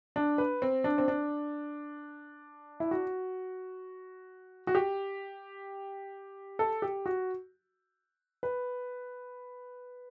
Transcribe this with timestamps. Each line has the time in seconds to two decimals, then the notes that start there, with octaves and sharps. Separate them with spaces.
0.16 D4
0.38 B4
0.62 C4
0.84 D4
0.98 C4
1.08 D4
2.80 E4
2.91 F#4
4.67 F#4
4.75 G4
6.59 A4
6.82 G4
7.06 F#4
8.43 B4